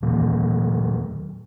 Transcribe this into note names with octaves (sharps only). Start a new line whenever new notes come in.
A#2 D#3 E3 F#3